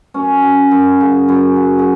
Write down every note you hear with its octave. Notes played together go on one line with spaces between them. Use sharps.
F#2 C#4
F#3
F#2
C#3
F#2
F#3
G#4